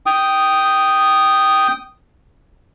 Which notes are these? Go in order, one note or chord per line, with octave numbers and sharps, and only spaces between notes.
G5 D#6